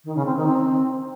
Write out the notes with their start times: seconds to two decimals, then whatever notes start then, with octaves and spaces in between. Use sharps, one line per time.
0.04 D#3
0.15 C#3
0.25 C4
0.36 D#3
0.46 C4